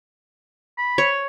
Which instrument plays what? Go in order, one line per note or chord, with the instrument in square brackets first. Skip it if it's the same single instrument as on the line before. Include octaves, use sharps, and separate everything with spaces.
[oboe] B5
[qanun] C#5